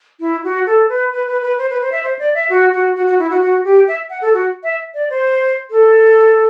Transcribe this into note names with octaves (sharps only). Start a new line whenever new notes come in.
E4
F#4
A4
B4
B4
B4
B4
C5
B4
C5
E5
C5
D5
E5
F#4
F#4
F#4
F#4
E4
F#4
F#4
G4
E5
F#5
A4
F#4
E5
D5
C5
A4